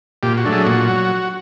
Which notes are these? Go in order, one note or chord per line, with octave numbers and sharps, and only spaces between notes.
A#2 G4
F#4
F#3 A3 D4
G#4
A#2 F#4
F#3